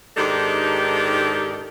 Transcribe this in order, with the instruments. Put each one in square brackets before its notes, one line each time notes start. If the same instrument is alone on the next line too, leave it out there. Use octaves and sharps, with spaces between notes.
[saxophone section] G#2 D#3 D4 D#4 G4 A4